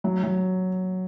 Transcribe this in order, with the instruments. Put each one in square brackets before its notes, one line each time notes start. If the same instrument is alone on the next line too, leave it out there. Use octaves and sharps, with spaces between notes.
[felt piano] F#3
F#3